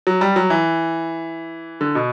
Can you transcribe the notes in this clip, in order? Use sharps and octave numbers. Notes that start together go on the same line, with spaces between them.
F#3
G3
F#3
E3
D3
B2